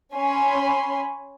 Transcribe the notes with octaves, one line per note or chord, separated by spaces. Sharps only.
C#4 C#5 G#5 B5 C6